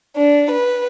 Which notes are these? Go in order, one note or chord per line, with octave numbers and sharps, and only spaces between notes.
D4
B4